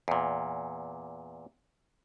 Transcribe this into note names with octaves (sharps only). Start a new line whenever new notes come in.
E2 A#2